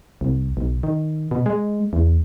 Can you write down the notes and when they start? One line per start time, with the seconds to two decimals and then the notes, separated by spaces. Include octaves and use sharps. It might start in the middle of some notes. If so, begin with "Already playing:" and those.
0.21 C2
0.57 B1
0.83 D#3
1.31 B2
1.46 G#3
1.93 E2